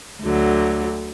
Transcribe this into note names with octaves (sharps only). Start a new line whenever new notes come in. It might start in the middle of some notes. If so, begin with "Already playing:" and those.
D2 D3 F#3